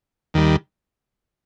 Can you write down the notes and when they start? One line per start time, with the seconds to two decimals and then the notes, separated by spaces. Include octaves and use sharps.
0.34 D#2 D#3 G3